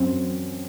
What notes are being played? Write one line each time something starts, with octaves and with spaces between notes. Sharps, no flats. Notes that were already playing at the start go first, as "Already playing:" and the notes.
Already playing: F#2 F#3 C4